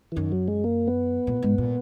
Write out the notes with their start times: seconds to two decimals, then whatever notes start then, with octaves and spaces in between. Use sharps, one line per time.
0.12 E3
0.16 F#2 D#3
0.32 F#3
0.48 G#3
0.64 A#3
0.88 B3
1.27 A#2
1.42 G#2
1.58 A#2